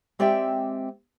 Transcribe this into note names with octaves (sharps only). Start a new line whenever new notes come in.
G#3 C4 G4 D5 E5 G5